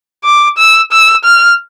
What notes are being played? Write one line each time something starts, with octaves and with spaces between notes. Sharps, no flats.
D6
E6
E6
F6